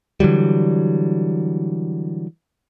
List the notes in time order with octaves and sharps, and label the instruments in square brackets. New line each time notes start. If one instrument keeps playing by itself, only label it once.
[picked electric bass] D3 E3 F#3 G3